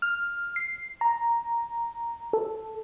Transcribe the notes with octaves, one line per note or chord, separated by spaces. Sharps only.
F6
C7
A#5
A4